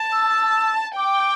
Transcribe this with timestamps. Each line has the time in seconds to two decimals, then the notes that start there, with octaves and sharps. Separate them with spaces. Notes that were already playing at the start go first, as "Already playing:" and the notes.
Already playing: A5
0.12 E6
0.96 G5 D6